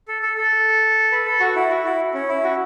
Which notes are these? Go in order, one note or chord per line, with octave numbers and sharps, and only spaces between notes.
A4
A4
A4
B4
A4
F#4
E4
F#4
E4
C#4
E4
F#4